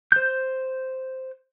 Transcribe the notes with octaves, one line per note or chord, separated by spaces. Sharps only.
C5 G6